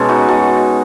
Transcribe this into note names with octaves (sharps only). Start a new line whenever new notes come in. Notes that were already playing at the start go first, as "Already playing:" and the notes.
Already playing: B2 G#3 C#4 A4
D#4 F#4
F#4 A4